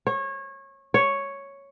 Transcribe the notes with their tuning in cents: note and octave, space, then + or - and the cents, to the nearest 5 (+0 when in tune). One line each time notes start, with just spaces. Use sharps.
C#5 -25
C#5 +0